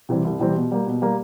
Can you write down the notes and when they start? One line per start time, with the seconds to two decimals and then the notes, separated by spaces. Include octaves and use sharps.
0.09 C3 E3 G3 C4
0.25 C2
0.40 C3 E3 G3 C4
0.55 B2
0.72 G3 A#3
0.87 B2
1.02 G3 A#3